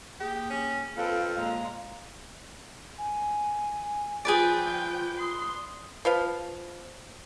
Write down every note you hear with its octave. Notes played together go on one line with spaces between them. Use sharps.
A#3 G4 G#4
C#4
F2 A4 B4 F5 G5
A#2 G#3 F5 A#5
G#5
F3 F4 G#4 B4 D5 G5
C6 D#6
F3 B4 F5